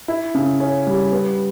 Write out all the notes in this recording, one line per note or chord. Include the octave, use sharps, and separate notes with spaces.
E4
C#3
C#4
G3
B3